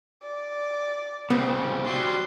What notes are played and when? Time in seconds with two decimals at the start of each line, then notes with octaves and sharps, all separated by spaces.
0.23 D5
1.30 C2 C#3 B3 C4
1.86 F#3 G3 C6